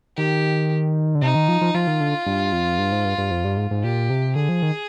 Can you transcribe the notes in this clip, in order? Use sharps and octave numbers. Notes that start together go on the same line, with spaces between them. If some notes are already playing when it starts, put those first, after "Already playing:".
D#3 G4
D3
C3 D#4
D#3
F3
F3
F3 F4
D#3
D3
G2
F2
G2
G#2
G2
G2
F2
G2
G#2
G#2
A#2 G4
C3
D3 G#4
F3
D#3